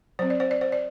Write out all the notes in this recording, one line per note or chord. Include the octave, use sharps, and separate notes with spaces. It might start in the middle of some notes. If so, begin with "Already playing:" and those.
F#3 C4 C5
D5
C5
D5
C5
D5